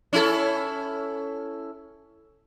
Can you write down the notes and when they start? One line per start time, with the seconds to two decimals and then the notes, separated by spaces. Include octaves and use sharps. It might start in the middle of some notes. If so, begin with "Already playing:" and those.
0.13 C#4 E4 A4